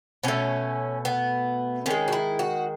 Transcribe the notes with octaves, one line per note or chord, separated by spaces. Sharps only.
B2 A3 C#4
B3
D#3 G#3 C#4
F#4
E4
F#4